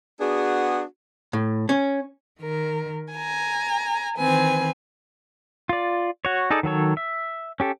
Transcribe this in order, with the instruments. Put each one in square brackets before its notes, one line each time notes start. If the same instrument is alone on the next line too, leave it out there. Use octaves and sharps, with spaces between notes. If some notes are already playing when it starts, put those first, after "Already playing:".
[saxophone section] B3 D4 F#4 G#4
[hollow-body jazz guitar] A2
C#4
[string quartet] D#3 A#4
G#5 A#5
D#3 E3 C4 B4 G#5
[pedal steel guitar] F4 D5
F#4 C#5
D#4 G#4 A4 D5
D#3 F#3 A4 C#5
E5
C#4 G4 A4